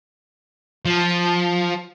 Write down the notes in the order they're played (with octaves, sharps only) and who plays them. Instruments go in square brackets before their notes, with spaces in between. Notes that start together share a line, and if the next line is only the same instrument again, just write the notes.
[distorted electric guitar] F3